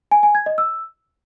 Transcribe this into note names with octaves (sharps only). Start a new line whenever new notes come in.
G#5
G#5
G#6
D#5
E6